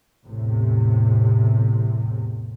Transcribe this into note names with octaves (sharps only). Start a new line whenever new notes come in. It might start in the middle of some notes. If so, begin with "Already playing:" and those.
A1 E2 A2 C3